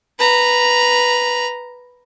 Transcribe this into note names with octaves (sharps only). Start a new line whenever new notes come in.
B4 A#5